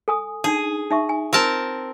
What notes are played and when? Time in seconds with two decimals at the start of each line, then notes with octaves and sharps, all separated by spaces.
0.08 A4 G#5 D#6
0.44 D4 D#4 G#4
0.91 D#4 E5 C#6
1.09 G#5
1.33 C4 F4 A#4 A5